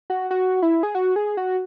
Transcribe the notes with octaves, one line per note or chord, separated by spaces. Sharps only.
F#4
F#4
E4
G#4
F#4
G#4
F#4